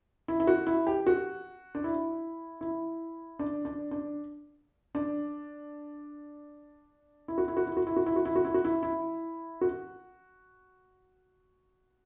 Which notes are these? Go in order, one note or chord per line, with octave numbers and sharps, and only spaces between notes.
E4
E4
F#4
E4
G4
F#4
D4
E4
E4
D4
D4
D4
D4
E4
F#4
E4
F#4
E4
F#4
E4
F#4
E4
F#4
E4
F#4
E4
F#4
E4
E4
F#4